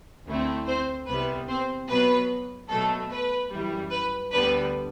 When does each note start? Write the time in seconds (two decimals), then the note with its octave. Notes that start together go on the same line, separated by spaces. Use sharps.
0.26 D2 D3 A3 C4 E4
0.67 C4 C5
1.07 C2 C3 G3 B3 B4
1.48 C4 C5
1.89 B2 F#3 B3 B4
2.69 B2 F#3 A3 A4
3.10 B4
3.51 F#2 E3 G3
3.91 B4
4.32 D2 D3 G3 B3 D4 B4